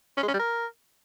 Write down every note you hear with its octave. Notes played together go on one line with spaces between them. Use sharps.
C#4
G#3
C#4
G3
A#4